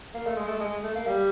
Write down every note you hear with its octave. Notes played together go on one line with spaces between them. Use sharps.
A#3
A3
G#3
A3
G#3
A3
A#3
G3